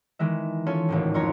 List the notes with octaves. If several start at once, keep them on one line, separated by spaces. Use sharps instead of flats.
D#3 E3 G#3 E5
C#4 F4 A4 C#5
G#1 C#2 A2
F2 F4 C#5 A#5